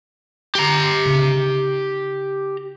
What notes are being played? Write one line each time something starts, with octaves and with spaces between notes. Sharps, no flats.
G4 A#5
C#3 D#4